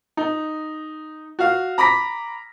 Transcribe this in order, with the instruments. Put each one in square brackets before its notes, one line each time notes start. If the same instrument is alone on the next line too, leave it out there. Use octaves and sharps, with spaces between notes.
[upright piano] D#4
F#4 F5
A#5 B5 D6 A#6 B6